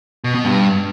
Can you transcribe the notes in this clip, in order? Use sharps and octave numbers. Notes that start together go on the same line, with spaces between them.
B2
B2
G2